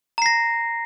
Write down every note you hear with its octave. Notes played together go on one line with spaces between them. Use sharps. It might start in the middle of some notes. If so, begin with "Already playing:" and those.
A#5 A#6 C7